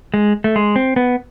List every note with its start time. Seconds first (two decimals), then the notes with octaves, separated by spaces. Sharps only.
0.14 G#3
0.44 A3
0.56 G#3
0.76 C4
0.96 B3